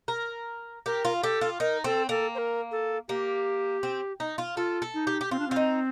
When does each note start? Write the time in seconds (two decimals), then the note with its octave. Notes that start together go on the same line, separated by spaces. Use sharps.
0.08 A#4
0.86 G4 A#4
1.05 F4
1.23 G4 A4
1.41 F4
1.60 D#4 A#4
1.84 C4 A4
2.09 A#3 A4
2.35 C5
2.38 A#4
2.72 A4
3.09 A#3 G4
3.83 C4
4.20 D#4
4.38 F4
4.57 F4 A4
4.82 A4
4.94 D#4
5.07 G4
5.21 G4
5.31 C4 F4
5.39 D4
5.48 C4 F4
5.56 D#4